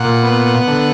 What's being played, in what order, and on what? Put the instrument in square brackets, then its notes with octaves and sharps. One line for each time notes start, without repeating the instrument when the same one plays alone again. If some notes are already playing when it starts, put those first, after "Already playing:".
Already playing: [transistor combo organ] A#2 F#5
B3
D3